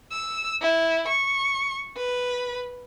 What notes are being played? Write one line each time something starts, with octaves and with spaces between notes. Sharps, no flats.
E6
E4
C#6
B4